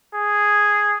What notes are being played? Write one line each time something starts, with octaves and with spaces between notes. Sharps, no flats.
G#4